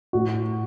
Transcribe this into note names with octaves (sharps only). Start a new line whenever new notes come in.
A2 F#4